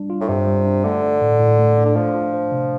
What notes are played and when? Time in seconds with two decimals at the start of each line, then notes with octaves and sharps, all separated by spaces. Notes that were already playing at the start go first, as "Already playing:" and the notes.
Already playing: G3 D4
0.10 F4
0.21 A2
0.29 G2 C3
0.47 G3
0.66 D4
0.84 D3 A3
1.03 D4
1.21 A2
1.40 A2
1.59 A3
1.77 D4
1.85 D3
1.95 F3 A3
2.15 F4
2.34 C5
2.52 C3